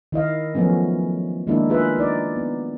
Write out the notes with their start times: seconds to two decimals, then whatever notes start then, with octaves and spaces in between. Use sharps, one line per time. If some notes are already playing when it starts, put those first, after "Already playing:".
0.12 D#3 E4 D#5 F5
0.55 F3 F#3 A3 B3 C#4
1.47 D#3 G#3 A#3 D4 E4
1.70 F4 G#4 B4 E5
1.98 D#4 D5
2.36 B3